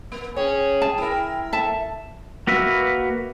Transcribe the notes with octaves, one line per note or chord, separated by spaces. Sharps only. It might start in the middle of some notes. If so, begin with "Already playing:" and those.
A#3
C#4 G#4 C#5 G5
A5
E4 A#4
A4 E5 A5
A#3 F#4 B4 E5